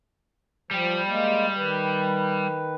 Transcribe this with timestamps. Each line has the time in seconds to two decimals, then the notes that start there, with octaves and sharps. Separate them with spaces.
0.71 F3 G3 G4
1.08 G#3 A#3
1.56 D#3 B4